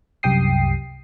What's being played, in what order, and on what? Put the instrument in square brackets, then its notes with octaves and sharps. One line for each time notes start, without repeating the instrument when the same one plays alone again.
[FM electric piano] C2 F#2 G4 G5 D#6 C7